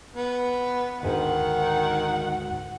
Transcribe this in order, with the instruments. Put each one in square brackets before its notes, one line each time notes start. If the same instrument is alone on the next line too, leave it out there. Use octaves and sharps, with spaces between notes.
[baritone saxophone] B3
[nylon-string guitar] D2 G#2 G#5 [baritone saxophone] D#3 [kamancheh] F#5